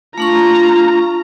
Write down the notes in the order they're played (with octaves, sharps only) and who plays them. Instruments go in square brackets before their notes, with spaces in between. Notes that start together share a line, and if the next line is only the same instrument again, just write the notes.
[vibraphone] A3 D4 C#6 [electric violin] F4 A#5